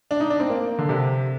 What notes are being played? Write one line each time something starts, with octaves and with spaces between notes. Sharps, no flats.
D4
D#4
D4
C4
A#3
D3
C3